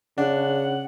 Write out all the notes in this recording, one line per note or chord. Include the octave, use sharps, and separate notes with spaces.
C#3 D4 F#5